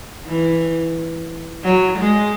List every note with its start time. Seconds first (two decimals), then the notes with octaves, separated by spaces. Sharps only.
0.26 E3
1.64 F#3
1.98 G#3